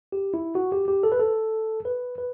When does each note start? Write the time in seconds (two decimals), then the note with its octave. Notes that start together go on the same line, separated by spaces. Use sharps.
0.12 G4
0.34 E4
0.55 F#4
0.72 G4
0.88 G4
1.03 A4
1.12 B4
1.19 A4
1.85 B4
2.18 B4